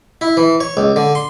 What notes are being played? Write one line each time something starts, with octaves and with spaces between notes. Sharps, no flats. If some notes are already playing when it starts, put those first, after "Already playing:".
E4
E3
C#5
C#2
D3
C6